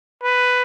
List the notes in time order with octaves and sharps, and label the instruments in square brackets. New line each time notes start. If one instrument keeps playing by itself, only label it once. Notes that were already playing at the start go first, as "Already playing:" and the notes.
[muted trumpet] B4